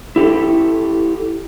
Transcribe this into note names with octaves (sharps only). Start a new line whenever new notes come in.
E4 G4 A4